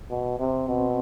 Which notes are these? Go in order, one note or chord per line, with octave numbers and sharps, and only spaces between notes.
B2
C3 C4
B2